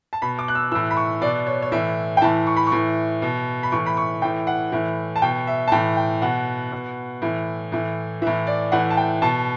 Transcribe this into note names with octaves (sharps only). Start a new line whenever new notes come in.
A5
B2 B5
D6
F#6
E6
A2 E3 E6
B5
C#6
B2 D5
C#5
C#5
A2 E3 E5
G5
A2 E3 A5
C#6
B5
C#6
A2 E3
B2
B5
A2 E3 C#6
B5
C#6
A2 E3 G5
F#5
A2 E3
A5
B2 G5
E5
A5
A2 E3 G5
G5
B2 F#5
B2
A2 E3
A2 E3
A2 E3 E5
D5
A2 E3 F#5
A5
G5
B2 A5